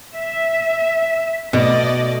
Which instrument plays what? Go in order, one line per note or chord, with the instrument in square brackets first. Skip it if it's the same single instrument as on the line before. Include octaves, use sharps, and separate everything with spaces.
[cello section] E5
[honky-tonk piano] B1 [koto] B2 [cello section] A3 [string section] D5 D#5